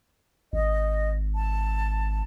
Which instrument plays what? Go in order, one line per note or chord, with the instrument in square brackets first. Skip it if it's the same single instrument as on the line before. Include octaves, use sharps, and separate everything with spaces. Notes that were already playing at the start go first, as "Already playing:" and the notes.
[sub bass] G#1 [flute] D#5
[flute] A5